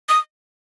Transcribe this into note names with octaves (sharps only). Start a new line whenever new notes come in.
D#6